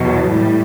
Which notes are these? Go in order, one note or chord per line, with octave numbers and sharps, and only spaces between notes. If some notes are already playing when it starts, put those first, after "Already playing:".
Already playing: E2 B2 F#3
A2 G3